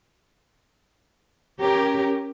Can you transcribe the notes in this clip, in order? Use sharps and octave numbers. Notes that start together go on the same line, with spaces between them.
C#4 G4 A#4